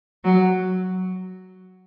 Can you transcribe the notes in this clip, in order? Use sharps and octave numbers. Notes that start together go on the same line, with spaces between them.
F#3